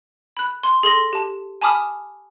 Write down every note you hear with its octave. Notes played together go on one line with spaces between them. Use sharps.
B5 F#6
C6
G#4 A4 C6 A#6
G4 A5
G#5 A5 B5 D6 D#6 F6